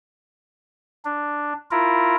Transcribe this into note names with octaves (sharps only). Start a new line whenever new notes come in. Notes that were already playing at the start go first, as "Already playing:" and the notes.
D4
E4 F4 A#4